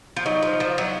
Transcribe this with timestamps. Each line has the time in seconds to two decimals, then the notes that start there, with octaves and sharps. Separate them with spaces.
0.16 F3
0.25 F#3 D#4
0.43 F3
0.60 F3
0.78 F#3